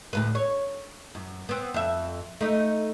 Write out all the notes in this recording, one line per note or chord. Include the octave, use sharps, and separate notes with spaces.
D2 A2 B4
C#5
F#2
B3 C4
F2 E5
A3 D#4